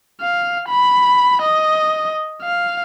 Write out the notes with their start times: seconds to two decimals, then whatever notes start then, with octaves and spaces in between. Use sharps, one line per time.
0.21 F5
0.68 B5
1.42 D#5
2.42 F5